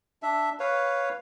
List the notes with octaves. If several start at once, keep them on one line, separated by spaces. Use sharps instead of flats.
D4 E5
B4 C#5 F5